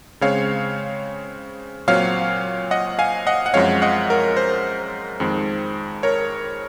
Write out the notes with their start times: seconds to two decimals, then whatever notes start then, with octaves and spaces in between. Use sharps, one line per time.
0.21 C#3 G#3 C4 C#5 F5
1.87 A#2 F#3 C4 C#5 F5
2.71 D#5 F#5
2.99 F5 G#5
3.27 D#5 F#5
3.46 F#5
3.54 F#2 F3 G#3 C4 C#5 F5
3.82 D#5 F#5
4.10 A#4
4.37 C5
5.20 F2 D#3 G#3 C4
6.03 A#4 C#5